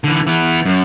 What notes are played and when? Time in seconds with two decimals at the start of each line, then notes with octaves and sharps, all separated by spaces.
0.04 D3 E3
0.27 E3 B3
0.65 F#2